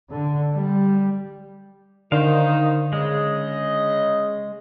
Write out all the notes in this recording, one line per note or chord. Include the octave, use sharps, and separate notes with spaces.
D3
G3
D3 D#3 D#4 C5 F5
C#3 G#3 D#5